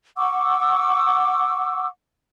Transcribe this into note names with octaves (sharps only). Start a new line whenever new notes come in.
F#5 C#6 D6 E6